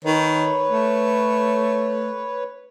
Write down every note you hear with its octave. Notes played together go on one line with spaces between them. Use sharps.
D#3 B4 C#5
A3